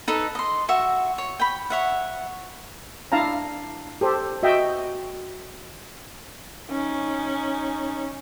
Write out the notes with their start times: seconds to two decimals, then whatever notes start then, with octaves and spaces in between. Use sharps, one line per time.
0.08 D#4 A4 B4
0.35 D#5 C6
0.69 F#4 E5 C#6
1.18 C#5
1.40 G5 B5
1.70 C#5 E5 F#5
3.12 D4 E4 F5 A5 A#5
4.01 G4 A4 C5
4.43 F#4 D#5 E5 G5
6.71 C#4 D#4